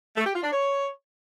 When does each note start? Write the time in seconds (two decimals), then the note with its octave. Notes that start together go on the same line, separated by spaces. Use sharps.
0.16 A3
0.25 G4
0.34 F4
0.43 D4
0.52 C#5